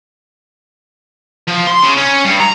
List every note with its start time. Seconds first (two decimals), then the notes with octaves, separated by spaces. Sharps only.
1.47 F3
1.67 C6
1.83 C#3
1.97 C#4
2.25 G2
2.40 A#5